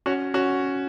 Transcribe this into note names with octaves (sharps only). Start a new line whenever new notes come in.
C#4 F#4
C#4 F#4